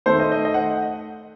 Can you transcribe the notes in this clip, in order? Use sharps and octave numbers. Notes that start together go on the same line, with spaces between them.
D#3 A3 C5
D#5
D#5
D#5
F#5